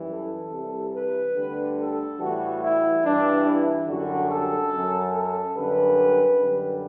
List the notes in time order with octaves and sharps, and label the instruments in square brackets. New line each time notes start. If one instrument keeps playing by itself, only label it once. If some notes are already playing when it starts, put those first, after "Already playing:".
Already playing: [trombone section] F#2 E3 G3
A4
C2 C3 E3 G3
B4
D2 D3 G3
A4
A2 E3 G3 F#4
E4
G2 E3 G3 D4
E4
F#2 D3 G3 F#4
A4
F#2 F#3
A4
F#2 D3 G3 B4
F#2 D3 G3